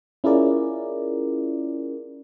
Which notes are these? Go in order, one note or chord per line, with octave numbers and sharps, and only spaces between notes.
C#4 E4 F4 G#4 A#4 D5